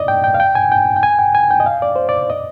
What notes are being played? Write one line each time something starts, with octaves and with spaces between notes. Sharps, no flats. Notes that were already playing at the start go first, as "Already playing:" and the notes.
Already playing: D5 D#5
G5
G5
F5
G5
G#5
G5
G5
G#5
G5
G#5
G5
D#5
F5
D5
C5
D5
D#5